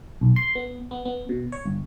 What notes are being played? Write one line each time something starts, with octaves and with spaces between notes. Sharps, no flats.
B1
C6
B3
B3
B3
B2
C#5
G1